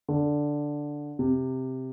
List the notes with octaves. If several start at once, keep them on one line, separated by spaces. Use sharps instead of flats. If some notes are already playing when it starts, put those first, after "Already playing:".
D3
C3